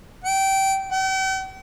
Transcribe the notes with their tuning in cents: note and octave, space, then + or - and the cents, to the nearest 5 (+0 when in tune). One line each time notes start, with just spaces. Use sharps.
G5 -20
G5 -45